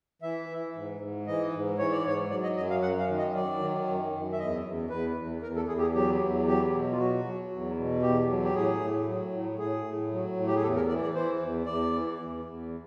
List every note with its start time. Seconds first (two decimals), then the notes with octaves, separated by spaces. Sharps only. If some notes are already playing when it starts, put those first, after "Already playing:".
0.22 E3 E5
0.49 E3
0.75 G#2
1.01 G#2
1.27 E3 D#5
1.53 G#2
1.78 E3 C#5
1.92 D5
2.04 G#2 C#5
2.30 F#3 D5
2.43 D#5
2.57 F#2 D#5
2.70 F5
2.82 F#2 F#5
3.00 F5
3.08 D#3
3.18 D#5
3.34 F#3 D5
3.61 D#3
3.87 F#2
4.12 F#2
4.32 E5
4.39 E2 D#5
4.65 E2
4.90 E2 B4
5.16 E2
5.42 E2 A#4
5.56 A4
5.68 E2 G#4
5.78 G4
5.81 G#4
5.95 F#3 G4
6.21 E2
6.47 F#3 G4
6.73 B2
6.92 F4
6.98 F#3 F#4
7.24 F#3
7.51 E2
7.77 B2
8.02 E2 G4
8.28 F#3
8.44 G4
8.55 A2 G#4
8.80 A2
9.06 F#3
9.32 A2
9.59 A2 G#4
9.85 A2
10.11 F#3
10.36 A2
10.47 G4
10.55 G#4
10.62 E2 A4
10.75 A#4
10.88 E3 D5
11.02 D5
11.14 E3 C5
11.41 E2
11.66 E2 D5
11.93 E3
12.19 E2
12.45 E2